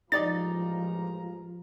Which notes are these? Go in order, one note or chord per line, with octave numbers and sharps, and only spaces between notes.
A1 F3 G#3 D#4 D5 D#5 A#5 A6